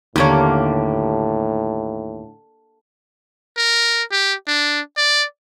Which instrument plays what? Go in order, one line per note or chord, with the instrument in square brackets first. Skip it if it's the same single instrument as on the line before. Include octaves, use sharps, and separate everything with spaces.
[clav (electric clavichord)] D#2 C#5 [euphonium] A2 [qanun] D3 A#3 G4
[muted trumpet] A#4
G4
D4
D5